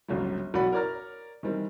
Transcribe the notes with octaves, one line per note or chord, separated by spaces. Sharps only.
G1 C#2 F#3 G3
B1 A2 F#4 D5 F#5 B5
A#4 C#5 D5 A#5 F6
D#3 E3 G3 C4